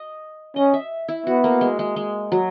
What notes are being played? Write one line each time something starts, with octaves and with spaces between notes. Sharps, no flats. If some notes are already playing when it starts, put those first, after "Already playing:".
Already playing: D#5
C#4 D#5
E5
E4
B3 F#4
A#3
G#3
G#3
G#3
F#3